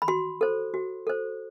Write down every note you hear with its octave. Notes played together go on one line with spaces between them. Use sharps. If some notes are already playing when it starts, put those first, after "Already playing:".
B5
F#4 C6
A4 C5
F#4
A4 C5